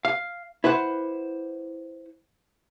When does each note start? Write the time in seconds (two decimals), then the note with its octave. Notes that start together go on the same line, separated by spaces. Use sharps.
0.05 F5
0.64 E4 B4 C5 F#5